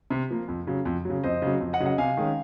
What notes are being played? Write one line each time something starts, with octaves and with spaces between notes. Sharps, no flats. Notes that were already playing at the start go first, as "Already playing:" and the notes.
C3
F3 A#3
F2
C#3 F#3
F2
C#3 F#3
F2 C5 D#5
C#3 F#3
F2
D#5 F#5
C#3 F#3
D#5 F#5
C3 F5 G#5
D#3 G#3 C#4